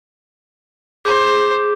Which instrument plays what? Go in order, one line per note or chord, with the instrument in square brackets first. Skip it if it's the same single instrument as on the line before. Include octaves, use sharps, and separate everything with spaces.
[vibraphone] G#4 [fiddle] C5 [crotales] D6 G6